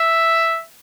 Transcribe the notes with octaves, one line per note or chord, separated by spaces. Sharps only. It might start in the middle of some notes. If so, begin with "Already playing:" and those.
Already playing: E5